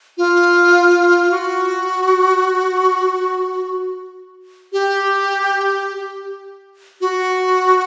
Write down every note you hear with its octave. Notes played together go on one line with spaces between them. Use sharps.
F4
F#4
G4
F#4